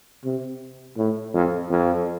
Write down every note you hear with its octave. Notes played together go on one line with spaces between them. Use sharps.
C3
A2
F2
F2